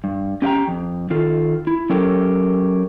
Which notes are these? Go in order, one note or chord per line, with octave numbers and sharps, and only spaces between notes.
G2
C#4 G4 C#5 F5 G5 A#5
F2
D#3 F4 A4
E4
F#3 C#4 G4 A4 A#4